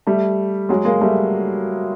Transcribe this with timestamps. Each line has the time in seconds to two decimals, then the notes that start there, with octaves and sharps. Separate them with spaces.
0.07 G3 A3
0.69 F#3 G#3
0.85 G#3 A#3
1.01 G3 A3